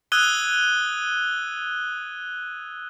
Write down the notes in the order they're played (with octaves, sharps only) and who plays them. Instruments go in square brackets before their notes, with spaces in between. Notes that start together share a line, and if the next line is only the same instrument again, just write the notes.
[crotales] D#6 E6 F#6 G#6 D#7 G7